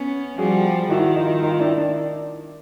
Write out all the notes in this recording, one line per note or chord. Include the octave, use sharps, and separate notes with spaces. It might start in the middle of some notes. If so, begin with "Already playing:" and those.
Already playing: B3 C#4
F3 G3 F#4 G#4
D#3 E4 F#4
D#4 F4
D#4 F4
D4 E4
D4